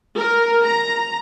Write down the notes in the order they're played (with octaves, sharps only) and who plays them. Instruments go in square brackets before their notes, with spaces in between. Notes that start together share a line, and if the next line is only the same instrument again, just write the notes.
[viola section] A#4
A#5